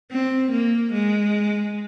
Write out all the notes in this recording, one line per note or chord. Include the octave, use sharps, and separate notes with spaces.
C4
A#3
G#3